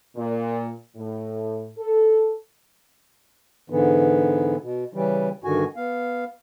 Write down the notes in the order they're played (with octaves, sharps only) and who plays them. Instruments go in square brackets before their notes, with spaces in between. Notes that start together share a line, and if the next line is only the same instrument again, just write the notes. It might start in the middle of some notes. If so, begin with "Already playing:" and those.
[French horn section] A#2
A2
A4
[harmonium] G#2 D3 E3 B3
B2
C#3 E3 G3
G2 D3 D#3 F#4 G#5
B3 F5